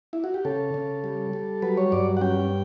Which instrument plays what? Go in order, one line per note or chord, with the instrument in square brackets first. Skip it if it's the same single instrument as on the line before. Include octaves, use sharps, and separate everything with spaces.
[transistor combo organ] E4
F#4
G4
C#3 A4
C#3
G3
G3
F#3 B4
C#5
G2 D5
F#5
C#4 G5